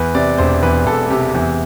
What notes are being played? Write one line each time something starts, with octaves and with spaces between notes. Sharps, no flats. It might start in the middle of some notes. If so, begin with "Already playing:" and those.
Already playing: E2 B4
C3 D5
E1 C5
E2 B4
E1 A4
C3 G4
E2